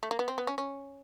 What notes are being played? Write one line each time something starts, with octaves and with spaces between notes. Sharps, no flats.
A3
A#3
B3
C4
B3
C#4
C#4